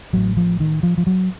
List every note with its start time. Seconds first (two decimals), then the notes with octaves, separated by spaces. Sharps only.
0.13 A1 A2 F#3
0.37 F3
0.60 D#3
0.83 F3
0.98 F3
1.07 F#3